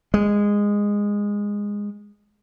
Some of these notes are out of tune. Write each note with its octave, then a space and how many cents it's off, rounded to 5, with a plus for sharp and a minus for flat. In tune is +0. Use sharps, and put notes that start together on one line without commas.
G#3 -15